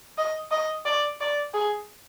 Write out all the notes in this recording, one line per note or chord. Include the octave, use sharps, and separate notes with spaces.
D#5
D#5
D5
D5
G#4